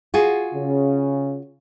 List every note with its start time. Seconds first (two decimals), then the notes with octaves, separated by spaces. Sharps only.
0.14 F4 F#4 G#4
0.54 C#3